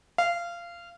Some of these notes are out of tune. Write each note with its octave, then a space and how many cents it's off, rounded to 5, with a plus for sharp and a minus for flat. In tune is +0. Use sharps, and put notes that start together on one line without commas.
F5 -20